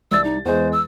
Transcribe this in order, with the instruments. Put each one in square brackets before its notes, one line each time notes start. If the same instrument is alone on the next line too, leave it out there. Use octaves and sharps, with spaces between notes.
[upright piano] C2 D5 A6 [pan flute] E6
[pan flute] D#4
[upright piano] E2 G#3 [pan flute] C5
[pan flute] E6